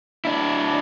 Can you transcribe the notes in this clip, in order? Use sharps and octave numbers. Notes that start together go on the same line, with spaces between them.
D4 E4